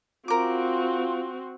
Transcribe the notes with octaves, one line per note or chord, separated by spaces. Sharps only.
C4 F4 F#4 A#4 D6